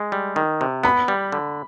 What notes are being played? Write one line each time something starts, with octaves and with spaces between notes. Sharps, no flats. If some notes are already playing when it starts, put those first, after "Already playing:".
Already playing: G#3
G3
D#3
C3
B3 B5
G3
D3